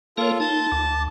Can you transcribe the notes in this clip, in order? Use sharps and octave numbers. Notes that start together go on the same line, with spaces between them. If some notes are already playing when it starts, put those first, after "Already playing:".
A#3 F4 A4 A#4 C#5
D#4 A5
D2